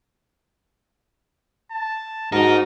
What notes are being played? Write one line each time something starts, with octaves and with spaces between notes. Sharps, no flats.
A5
G#2 D#4 F#4 A#4 A#5 A6